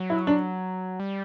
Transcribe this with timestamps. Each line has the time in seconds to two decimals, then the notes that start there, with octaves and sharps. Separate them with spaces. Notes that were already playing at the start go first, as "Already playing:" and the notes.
Already playing: F#3
0.10 E4
0.27 D4
1.00 G3